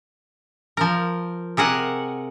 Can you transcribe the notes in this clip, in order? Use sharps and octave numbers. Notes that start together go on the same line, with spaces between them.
F3 A#4
C3 G#4 A#4 F#5